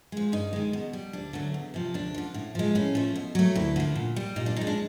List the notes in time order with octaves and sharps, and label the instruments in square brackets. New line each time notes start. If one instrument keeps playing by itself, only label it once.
[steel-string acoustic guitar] F3 G#3
G2 D#4
D#3 G#3
B2
G3
D2 D4
D3 F#3 A3
E2
C3 F3
D2 D4
D3 F3
A2
F3 G#3
A2 C#4
F3 A3
B2
F#3 A3
D2 E4
D3 F3
A#2
G3
A#2 D#4
D4
F3 D#4
G#3
D4